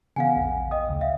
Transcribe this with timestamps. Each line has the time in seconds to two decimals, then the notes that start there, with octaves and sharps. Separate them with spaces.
0.16 C#3 E3 B3 F5 F#5 G#5
0.36 A#1 E2
0.71 D#5 G5 D#6
0.89 D2 C#3
1.01 E5 F5